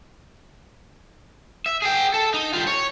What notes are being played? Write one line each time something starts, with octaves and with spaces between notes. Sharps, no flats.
E5
G#4 G5
A4
D#4
G3 F4
C#5